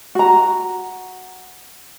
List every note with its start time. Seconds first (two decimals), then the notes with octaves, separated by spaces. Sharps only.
0.15 F#4 A#5